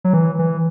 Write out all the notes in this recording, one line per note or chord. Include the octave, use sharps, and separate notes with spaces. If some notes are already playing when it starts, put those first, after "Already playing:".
F#3
E3
E3